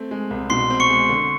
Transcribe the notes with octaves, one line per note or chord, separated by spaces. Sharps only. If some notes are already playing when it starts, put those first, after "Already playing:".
Already playing: A3 C4
G#3
C2
B2 C6 C7
C4
C#6 C#7
G#3
D3